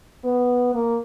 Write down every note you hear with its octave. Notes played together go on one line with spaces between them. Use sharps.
B3
A#3